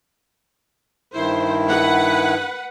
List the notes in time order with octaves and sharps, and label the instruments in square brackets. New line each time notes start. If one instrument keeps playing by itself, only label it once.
[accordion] G2 D#3 E4 [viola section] C5
[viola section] B4 F#5